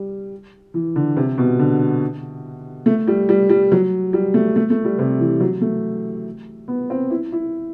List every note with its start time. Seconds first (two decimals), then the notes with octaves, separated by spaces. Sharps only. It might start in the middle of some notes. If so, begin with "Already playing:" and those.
Already playing: G3
0.74 E3
0.96 D3
1.17 C3
1.38 B2
1.59 D3
2.86 A3
3.08 G3
3.29 G3
3.50 G3
3.72 F#3
4.13 G3
4.34 A3
4.56 A3
4.70 A3
4.85 G3
4.99 C3
5.20 E3
5.40 F#3
5.61 A3
6.68 B3
6.90 C4
7.10 E4
7.32 E4